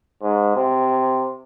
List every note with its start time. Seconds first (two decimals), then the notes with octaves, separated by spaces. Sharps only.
0.22 G#2
0.56 C3